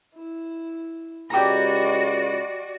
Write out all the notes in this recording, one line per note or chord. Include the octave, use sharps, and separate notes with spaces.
E4
C#2 F#4 G4 D5 D#5 A#5 B5